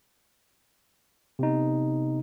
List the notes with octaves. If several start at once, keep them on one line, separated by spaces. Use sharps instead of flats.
C3 B3 D#4